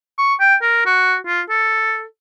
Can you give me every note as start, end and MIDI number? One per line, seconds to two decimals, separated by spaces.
0.18 0.34 85
0.40 0.56 79
0.62 0.82 70
0.86 1.16 66
1.26 1.42 65
1.49 2.04 69